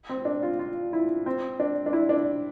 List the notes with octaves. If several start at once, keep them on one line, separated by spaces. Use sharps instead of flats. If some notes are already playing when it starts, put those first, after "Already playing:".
C4
D4
F4
F4
E4
C4
D4
D4
E4
D4